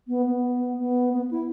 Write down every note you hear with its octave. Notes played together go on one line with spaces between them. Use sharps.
B3
B3
B3
B3
E4